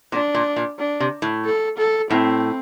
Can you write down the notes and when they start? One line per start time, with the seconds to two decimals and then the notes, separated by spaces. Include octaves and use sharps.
0.12 A#2 D4
0.35 A#2
0.56 A#2
0.79 D4
1.00 C3
1.22 A2
1.45 A4
1.78 A4
2.10 A2 C4